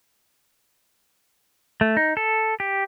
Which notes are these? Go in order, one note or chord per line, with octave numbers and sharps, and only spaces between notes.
A3
D#4
A4
G4